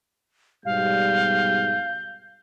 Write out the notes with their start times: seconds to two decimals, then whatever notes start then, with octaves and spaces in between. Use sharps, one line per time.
0.65 G#2 B2 G3 F5 G6